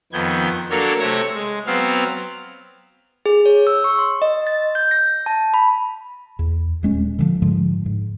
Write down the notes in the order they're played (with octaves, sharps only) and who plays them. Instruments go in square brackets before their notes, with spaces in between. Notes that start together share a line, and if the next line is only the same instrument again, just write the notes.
[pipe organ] F2 D#3 B3 G6 G#6
F#3 A#3 D4 A4 A#4 C#5
C3 A3 C#5 G#6 A#6
G#3
F#3 B3 C4 F5 F6
[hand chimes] G#4
C#5
E6
C#6
C6
D#5
A6
G6
A#6
A5
B5
[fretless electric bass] E2
D#1 G#3 C#4
D3 E3 F3
G#2 D3 F3 G#3
G#2